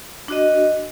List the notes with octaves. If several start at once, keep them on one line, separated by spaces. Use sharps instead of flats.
D4 F#4 D#5